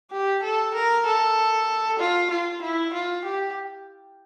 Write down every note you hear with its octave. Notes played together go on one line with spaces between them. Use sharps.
G4
A4
A#4
A4
F4
F4
E4
F4
G4